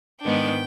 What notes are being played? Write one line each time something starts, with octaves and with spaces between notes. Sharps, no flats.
G#2 D#3 G#3 B3 D4 G5